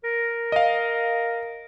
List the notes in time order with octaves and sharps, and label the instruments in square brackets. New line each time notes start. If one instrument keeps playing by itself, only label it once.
[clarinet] A#4
[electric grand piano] D#5 F5